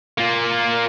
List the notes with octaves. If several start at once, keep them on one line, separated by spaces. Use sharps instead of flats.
A#3 F4